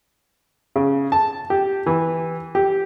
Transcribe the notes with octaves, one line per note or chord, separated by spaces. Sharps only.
C#3
A5
G4
E3
G4